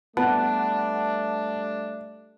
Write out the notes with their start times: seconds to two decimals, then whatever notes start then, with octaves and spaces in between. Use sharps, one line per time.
0.17 G3 A3 B3 D4 F#5 A5